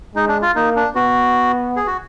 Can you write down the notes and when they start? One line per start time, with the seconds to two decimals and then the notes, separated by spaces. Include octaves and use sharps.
0.15 G#3 D#4
0.28 D4
0.42 F4
0.56 A#3 D#4
0.76 D4
0.95 B3 F#4
1.76 G#4
1.87 F#4